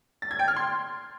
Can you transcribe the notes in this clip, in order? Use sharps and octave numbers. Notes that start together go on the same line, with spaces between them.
A6
G#6
G5
F6
C6